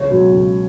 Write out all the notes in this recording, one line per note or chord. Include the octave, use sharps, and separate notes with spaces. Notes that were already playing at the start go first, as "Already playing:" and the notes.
Already playing: C#2 C#5
B2 F#3
C#2